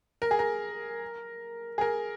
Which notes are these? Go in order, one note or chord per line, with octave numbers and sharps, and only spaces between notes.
A#4
G#4
A#4
G#4
A#4